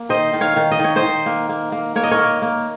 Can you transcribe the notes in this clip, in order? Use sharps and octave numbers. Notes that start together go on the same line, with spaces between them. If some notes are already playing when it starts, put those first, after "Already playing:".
Already playing: A#3
D#3 C5 D#5
D#3
C#5 F5
D#3
D#5
D#3 C#5
C5 D#5
D#3
A#3
A#3
A#3
A#3 C#5
D#5
A#4 C#5
A#3
A#3